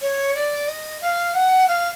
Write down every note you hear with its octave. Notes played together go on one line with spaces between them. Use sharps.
C#5
D5
D#5
F5
F#5
F5